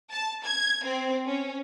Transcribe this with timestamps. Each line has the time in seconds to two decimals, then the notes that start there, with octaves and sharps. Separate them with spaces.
0.11 A5
0.44 G#6
0.84 C4
1.28 C#4